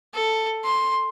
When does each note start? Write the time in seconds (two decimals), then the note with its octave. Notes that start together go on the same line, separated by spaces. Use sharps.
0.15 A4
0.65 C6